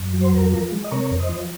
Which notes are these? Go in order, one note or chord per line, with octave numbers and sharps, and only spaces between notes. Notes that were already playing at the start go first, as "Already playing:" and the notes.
Already playing: F#2
F#3
C5
F2 A#4
F3 A#4
G#3
D#5
C3 A#4 C#5
F2
C5 D#5
F3